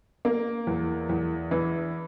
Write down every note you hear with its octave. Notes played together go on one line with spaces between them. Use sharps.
A#3
E2
E2
E3